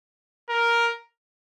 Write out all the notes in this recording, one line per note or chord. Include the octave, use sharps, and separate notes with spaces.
A#4